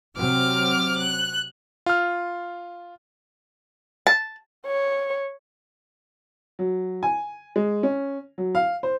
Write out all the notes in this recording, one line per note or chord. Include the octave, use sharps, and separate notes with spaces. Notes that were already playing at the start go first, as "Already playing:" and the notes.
C3 F#3 C4 D6 F6
F#6
F4 F6
A5
C#5
F#3
G#5
G#3
C#4
F#3
F5
C5